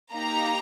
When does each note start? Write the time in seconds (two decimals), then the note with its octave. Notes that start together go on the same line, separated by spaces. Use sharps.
0.12 A#3 D#4 G4 A#5